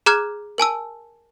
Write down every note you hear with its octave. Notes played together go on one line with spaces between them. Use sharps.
G#4 A#5 D6 F6 F#6 G#6
A#4 G#5 A5 E6